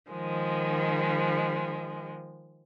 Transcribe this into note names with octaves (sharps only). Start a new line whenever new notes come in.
D#3 F3 G#3